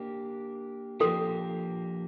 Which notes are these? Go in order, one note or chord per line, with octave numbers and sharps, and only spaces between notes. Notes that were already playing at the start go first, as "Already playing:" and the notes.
Already playing: A#3 D4 G4
F3 A#3 D4 G4 A4